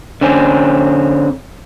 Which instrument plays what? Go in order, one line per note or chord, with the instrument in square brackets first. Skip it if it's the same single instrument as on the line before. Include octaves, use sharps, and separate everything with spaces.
[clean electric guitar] D3 C4 C#4